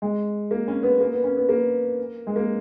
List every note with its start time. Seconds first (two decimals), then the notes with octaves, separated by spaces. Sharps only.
0.02 G#3
0.51 A#3
0.68 C#4
0.83 B3
1.00 A#3
1.13 B3
1.24 C#4
1.37 B3
1.49 A#3
2.27 G#3
2.36 A#3